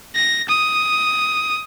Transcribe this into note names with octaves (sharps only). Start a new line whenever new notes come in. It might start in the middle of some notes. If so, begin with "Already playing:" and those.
A#6
D#6